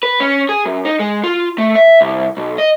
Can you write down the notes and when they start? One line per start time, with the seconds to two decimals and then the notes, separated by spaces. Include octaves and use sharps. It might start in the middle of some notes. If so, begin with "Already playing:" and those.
0.03 B4
0.20 C#4
0.49 G#4
0.65 F#2
0.85 D#4
1.00 G#3
1.24 F4
1.58 A3
1.75 E5
2.01 C2
2.37 B1
2.58 D#5